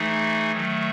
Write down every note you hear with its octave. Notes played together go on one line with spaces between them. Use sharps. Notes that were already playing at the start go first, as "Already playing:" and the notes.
Already playing: E3 A3 D#4 G#4
D#3 F#3 A3